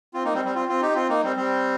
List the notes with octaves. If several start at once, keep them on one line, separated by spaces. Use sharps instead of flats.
C4 F4
A#3 D#4
G3 C4
G3 C4
C4 F4
C4 F4
D#4 G4
C4 F4
A#3 D#4
G3 C4
G3 C4